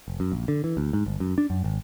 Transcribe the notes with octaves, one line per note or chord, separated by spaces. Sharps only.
F1
F#2
A#1
D3
E3
D2
G#2
G1
F#2
D4
F#2
G#1